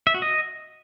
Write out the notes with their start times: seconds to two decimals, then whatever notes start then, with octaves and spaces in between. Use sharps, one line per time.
0.07 E5
0.14 F#4
0.22 D#5